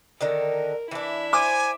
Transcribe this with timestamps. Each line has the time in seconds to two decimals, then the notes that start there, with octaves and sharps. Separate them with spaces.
0.21 D3 D#3 D#4 A#4
0.91 E3 D4 E4 E5
1.33 C5 G#5 D6